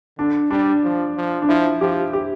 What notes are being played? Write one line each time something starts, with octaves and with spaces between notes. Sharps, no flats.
D3 D4
G3 D4
F3
F3
D4
F3 E4
F3 G4
G4